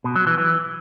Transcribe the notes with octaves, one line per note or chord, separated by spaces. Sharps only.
B2
F#3
E3
E3